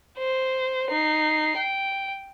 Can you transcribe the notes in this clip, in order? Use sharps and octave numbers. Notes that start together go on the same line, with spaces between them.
C5
D#4 C7
G5